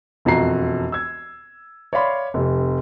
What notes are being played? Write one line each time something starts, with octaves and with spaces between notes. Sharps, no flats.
E1 F2 F3 F#4 A#5 C7
E6 G#6
C#5 D5 E5 F5 B5 C6
F1 C3